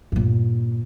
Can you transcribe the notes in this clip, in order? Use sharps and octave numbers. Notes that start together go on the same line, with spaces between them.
G2 A#2